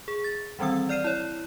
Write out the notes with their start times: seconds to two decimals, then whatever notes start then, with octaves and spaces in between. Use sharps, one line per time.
0.08 G#4
0.24 A6
0.59 D#3 E3 G3 C4 E6
0.89 D5 F6 C7 D#7 E7
1.04 E4 C#5